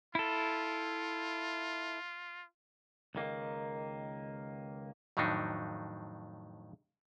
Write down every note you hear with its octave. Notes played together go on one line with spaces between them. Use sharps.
E4 F4 A4
C#2 D#3 A#3
F2 A2 D#3 F#3 D4 D#4